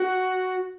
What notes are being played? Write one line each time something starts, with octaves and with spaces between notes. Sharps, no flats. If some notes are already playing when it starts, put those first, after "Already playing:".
Already playing: F#4